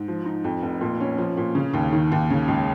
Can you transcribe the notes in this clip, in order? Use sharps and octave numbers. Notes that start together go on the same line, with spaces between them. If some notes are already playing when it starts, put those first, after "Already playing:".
Already playing: G#2
F3
D#4
F2
F1
A#2
C#4
F3
A#2
C#3
D#2
D#3
D#2
C#3
C#2